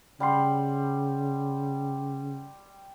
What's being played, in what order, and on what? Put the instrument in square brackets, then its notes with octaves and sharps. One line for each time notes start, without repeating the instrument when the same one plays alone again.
[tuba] C#3 [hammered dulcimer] G3 F#5 C6